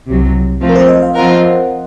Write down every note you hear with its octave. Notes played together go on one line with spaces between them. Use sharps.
C2 C3 F#3
F3 A3 C4 F4
A#4
C5
D#5
F5
F3 C4 F4 A#4 F#5